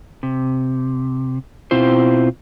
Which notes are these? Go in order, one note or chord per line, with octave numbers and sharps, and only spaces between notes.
C3
B2 C4 E4 F4 C5